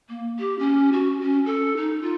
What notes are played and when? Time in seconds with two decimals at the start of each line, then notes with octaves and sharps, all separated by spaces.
0.09 A#3
0.39 G4
0.59 C#4
0.93 F#4
1.22 C#4
1.46 A4
1.77 D#4
2.02 F4